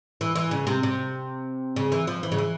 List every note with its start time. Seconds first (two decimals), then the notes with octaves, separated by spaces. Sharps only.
0.21 E3
0.35 E3
0.51 C#3
0.67 C3
0.83 C3
1.76 C#3
1.92 E3
2.07 F3
2.23 E3
2.32 C#3
2.38 E3